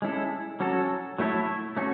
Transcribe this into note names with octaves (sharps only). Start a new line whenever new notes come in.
G#3 C#4 E4 A4
F#3 C#4 F#4 A4
F#3 A3 E4 A4 C#5
A3 C#4 F#4